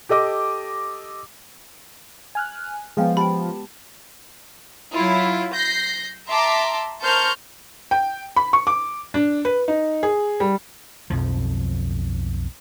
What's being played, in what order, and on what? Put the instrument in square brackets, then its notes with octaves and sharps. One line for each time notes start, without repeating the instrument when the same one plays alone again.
[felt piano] G4 A4 D#5 D6
[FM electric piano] G#5 F6 F#6
[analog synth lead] F3 [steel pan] G#3 B3 [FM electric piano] G#4 F5 G5
[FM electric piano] G4 A5 [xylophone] G5 B5
[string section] F#3 E4 F4
G6 A#6 C7
E5 A5 A#5 C6 D6
A#4 C5 A5 C#6 F6 G6
[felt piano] G5
B5
C#6
D6
D4
B4
D#4
G#4
G3
[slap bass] B1 F2 F3